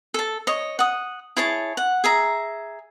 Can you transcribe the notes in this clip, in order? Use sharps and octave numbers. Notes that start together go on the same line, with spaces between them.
A4 A5
C#5 D#5
F#5 D#6
E4 G#4 C#5 A5
F#5
G#4 E5 A#5